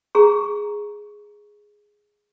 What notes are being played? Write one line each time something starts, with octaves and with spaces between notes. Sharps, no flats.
G#4 A#5 C#6